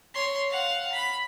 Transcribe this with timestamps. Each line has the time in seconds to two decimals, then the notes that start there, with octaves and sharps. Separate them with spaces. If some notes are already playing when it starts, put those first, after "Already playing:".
0.14 C#5 C6
0.50 F5 F#5
0.93 B5